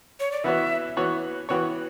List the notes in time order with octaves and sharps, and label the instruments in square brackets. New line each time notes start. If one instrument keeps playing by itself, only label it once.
[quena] C#5
D5
[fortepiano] E3 B3 F#4 C#5 [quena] E5
[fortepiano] E3 B3 F#4 C#5
[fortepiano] E3 B3 F#4 C#5 [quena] G5